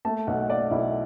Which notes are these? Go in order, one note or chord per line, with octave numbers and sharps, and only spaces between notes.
A3 A5
B1 F#5
A3 D5
B1 E4